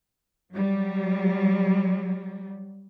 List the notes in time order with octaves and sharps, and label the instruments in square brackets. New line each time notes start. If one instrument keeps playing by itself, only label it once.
[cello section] F#3 G3